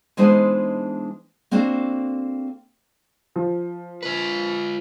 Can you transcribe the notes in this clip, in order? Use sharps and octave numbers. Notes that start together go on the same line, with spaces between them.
E3 G#3 B3 D4 D#4 C5
A#3 C4 D4 F#4 A4
F3
F4 B4